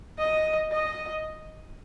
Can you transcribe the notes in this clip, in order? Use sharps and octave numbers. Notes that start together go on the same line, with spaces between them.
D#5
D#5